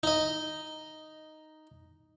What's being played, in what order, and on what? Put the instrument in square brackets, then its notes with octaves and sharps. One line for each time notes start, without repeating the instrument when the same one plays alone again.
[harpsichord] D#4 D#5